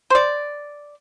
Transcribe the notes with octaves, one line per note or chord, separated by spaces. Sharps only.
C5 D5